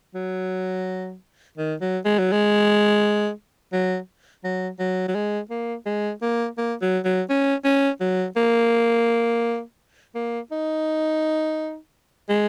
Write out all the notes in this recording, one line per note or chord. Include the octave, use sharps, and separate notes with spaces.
F#3
D#3
F#3
G#3
F#3
G#3
F#3
F#3
F#3
F#3
G#3
A#3
G#3
A#3
A#3
F#3
F#3
C#4
C#4
F#3
A#3
A#3
D#4
G#3